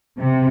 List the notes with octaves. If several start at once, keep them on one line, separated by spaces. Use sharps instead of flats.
C3